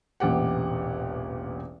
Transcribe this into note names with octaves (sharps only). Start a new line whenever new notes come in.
E1 A1 A#2 G4 F#5